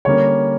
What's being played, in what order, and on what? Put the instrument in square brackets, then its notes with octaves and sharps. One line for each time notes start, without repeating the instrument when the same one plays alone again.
[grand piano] D3 G3 A#3 C#4 C#5